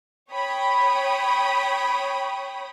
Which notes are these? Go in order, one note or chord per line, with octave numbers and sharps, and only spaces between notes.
C#5 G5 B5 D#6